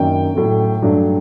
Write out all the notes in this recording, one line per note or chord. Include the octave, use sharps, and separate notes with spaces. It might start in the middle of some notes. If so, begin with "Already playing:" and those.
Already playing: F#2 D#3 F#3 A#3 D4 G5
A2 F#3 A3
G2 F#3 A3 D4